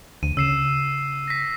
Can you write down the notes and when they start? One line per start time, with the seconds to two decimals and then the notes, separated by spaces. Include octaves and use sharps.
0.23 D2 D#7
0.37 C#3 E6 C7 E7
1.28 A#6 B6